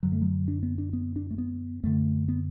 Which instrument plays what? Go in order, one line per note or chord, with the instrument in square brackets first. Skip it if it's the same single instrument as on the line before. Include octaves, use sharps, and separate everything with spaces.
[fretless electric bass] F#2 D3 F#3
A3
F#3
D4
B3
D4
B3
D4
A3
B3
F#2 D3 A3
B3